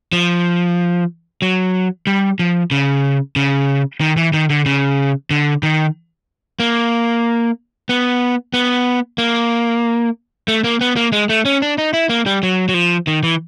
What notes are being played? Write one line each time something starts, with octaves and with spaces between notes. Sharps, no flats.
F3
F#3
G3
F3
C#3
C#3
D#3
E3
D#3
D3
C#3
D3
D#3
A#3
B3
B3
A#3
A3
A#3
B3
A#3
G#3
A3
C#4
D4
D#4
E4
A#3
G3
F#3
F#3
F3
D#3
E3